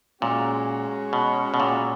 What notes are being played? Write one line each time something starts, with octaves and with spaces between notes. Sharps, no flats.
A#2 G#3 C#4 F#4
B2
B2
A#2